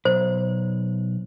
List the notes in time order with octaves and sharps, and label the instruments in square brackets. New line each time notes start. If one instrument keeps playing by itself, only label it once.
[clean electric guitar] B1 [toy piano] C5